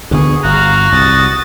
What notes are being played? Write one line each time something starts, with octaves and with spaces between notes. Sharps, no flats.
D2 D3 B3 G#4 C#6
G1 F#4 F5 A#5
C2 D#6 A6